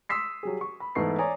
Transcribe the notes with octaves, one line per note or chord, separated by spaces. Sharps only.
C6 D#6 E6 B6 C7
F#3 G3 G#4
C#6
B5
G#2 E3 A3 B3 C#6 C7
C#5 D5 G#5 A#5 D#6